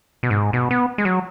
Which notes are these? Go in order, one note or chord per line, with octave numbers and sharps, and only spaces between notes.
B2
G#2
B2
B3
G#3
F#3